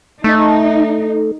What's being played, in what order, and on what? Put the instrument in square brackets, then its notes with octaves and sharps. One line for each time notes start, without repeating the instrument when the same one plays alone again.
[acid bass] A3 [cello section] D#4